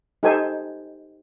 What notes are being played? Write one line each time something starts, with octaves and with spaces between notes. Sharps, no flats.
D#4 G4 A4 C5 G#5